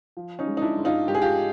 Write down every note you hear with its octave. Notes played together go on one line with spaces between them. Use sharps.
F3
C#4 D#4
G#3
D#4
D4 E4
G#2
D#4 F4
G#2 G4
G#4
F4 G4